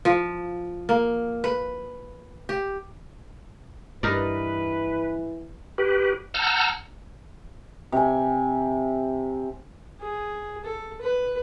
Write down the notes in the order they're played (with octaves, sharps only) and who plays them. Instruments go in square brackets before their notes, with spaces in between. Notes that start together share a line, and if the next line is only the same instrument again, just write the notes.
[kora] F3
A#3
B4
G4
[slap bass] G2 [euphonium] E3 [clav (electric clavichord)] D#4 A#4 D5 [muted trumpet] B4
[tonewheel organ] G4 B4
F#5 A5 A#5 E6 F6 G6
[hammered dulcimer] C3 G#5
[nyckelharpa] G#4
A4
B4